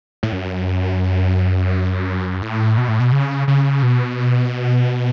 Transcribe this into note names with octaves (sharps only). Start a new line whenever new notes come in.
A2
F#2
A2
B2
A2
B2
C#3
C#3
B2